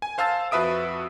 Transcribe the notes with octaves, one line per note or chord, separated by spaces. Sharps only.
G#5
C5 F5 A5 E6 A6
F2 F#4 B4 E5 D#6 D7